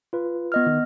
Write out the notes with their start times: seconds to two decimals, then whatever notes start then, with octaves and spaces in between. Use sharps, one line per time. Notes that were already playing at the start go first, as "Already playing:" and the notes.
0.13 F4 B4
0.52 B3 D#5 F6
0.66 D#3